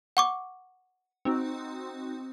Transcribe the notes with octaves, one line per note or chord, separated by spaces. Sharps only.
F#5 C#6 D6
C4 D#4 F#4